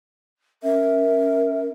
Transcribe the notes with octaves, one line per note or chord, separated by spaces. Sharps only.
C#4 A#4 E5